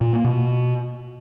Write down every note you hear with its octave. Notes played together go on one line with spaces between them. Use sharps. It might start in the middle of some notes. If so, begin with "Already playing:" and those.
A#2
A#3
B2